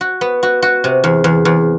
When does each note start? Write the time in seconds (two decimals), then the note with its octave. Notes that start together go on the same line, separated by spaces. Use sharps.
0.01 F#4
0.21 B3
0.43 F#4
0.62 F#4
0.84 C3
1.04 E2
1.24 E2
1.45 E2